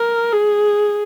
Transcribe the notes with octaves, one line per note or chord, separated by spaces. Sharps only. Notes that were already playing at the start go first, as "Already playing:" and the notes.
Already playing: A#4
G#4